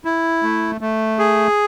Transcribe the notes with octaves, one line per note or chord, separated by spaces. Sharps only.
E4
A3
A3
G#4